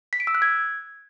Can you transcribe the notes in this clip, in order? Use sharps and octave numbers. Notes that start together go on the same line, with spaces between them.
B6
D7
E6
F#6
G#6